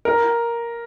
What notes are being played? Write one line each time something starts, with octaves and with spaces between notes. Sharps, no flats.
A#4